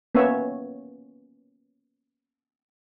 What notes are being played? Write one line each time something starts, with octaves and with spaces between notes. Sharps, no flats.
A#3 B3 C#4 C#5 E5